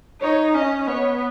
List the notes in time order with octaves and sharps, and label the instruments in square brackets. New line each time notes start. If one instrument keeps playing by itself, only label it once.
[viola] D#4 [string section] C#5
[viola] C#4 [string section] D#5
[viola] B3 [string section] C#5